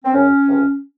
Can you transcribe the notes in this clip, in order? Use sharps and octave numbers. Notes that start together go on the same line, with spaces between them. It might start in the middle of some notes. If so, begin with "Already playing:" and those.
C4
F#2 C#3 F#3 C#4
C#2 C3 F3